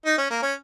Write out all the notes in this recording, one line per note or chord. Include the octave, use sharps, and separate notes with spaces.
D#4
C#4
A#3
C#4